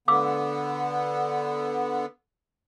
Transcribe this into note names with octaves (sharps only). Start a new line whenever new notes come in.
D3 B3 F5 D6 E6